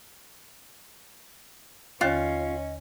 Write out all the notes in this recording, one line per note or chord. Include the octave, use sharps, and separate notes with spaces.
D#2 D3 C#4 F4 D#5 A6